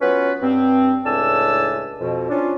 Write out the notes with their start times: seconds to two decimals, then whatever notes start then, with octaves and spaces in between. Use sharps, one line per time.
0.02 F#3 B3 C#4 F4 B4
0.43 G2 C4
1.06 C#2 A2 D4 G#5 A5 E6
2.00 F2 B2
2.30 C#4 D4 F4